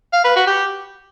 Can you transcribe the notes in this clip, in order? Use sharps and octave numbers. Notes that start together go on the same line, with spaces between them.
F5
B4
F#4
G4